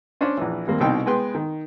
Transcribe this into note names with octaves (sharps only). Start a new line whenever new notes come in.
C#4 D4 C5 D5
A#1 E3
D#2 G3 A#3 C4
C2 B2 C4 D#4 G5
G#3 B3 B4 G5 C6
D#3